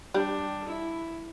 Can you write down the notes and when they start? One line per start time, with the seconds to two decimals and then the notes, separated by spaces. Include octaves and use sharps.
0.14 G3 D4
0.67 E4